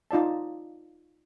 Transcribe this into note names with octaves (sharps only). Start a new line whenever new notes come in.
D#4 F4 D5 A5